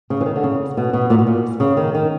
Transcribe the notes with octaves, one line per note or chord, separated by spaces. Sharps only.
C#3
E3
D#3
D3
C#3
B2
B2
A#2
B2
A#2
C#3
D#3
D#3